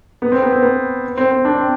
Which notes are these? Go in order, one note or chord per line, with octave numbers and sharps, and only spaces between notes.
B3
C4
B3
C4
B3
C4
C4
D4
C4